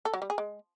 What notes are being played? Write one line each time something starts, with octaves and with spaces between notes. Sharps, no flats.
A4
F#3
G3
G#4
G#3